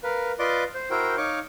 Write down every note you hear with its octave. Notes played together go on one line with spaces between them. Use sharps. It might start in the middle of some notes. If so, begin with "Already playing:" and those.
A#4 B4 F5
F4 B4 D5 D#5 C6 D6
C5
E4 F#4 A#4 C5 G5
D#4 C#5 F5 C#6 D6